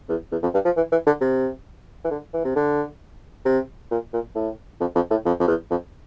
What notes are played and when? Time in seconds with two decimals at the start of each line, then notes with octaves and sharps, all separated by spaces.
0.09 E2
0.32 E2
0.43 F2
0.54 G2
0.65 F3
0.77 E3
0.92 E3
1.07 D3
1.21 C3
2.05 E3
2.11 D3
2.34 E3
2.45 C3
2.56 D3
3.45 C3
3.91 A#2
4.13 A#2
4.35 A2
4.81 F2
4.95 F2
5.11 A2
5.25 F2
5.40 F2
5.48 E2
5.71 F2